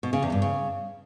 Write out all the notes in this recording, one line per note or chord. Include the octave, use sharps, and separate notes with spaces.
B2
C#3
E2
G2
C#3